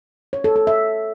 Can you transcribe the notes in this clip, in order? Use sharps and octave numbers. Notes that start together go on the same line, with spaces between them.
C#5
A4
A4
E5